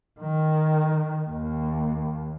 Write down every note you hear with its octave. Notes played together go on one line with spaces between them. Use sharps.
D#3
D#2